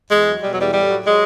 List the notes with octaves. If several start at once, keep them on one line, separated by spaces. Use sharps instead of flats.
E2 G#3
F#3
B2 G3
F#3
E2 G3
A2 G3
F#3
F#3 G#3